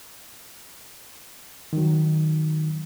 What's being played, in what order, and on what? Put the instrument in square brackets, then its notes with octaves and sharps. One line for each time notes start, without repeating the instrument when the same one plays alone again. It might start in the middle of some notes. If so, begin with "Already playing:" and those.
[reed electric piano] D#3 F#3